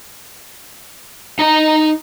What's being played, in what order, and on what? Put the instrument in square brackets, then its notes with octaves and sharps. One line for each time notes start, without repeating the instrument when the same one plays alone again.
[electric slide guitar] D#4 D#5 A#5